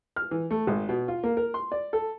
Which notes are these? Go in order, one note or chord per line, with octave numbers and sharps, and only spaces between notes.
F6
E3
A3
G#1
B2
F4
A#3
A#4
C6
D5
A4